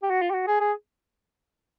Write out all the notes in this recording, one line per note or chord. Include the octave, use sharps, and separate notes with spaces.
G4
F#4
F4
G4
F#4
G#4
G#4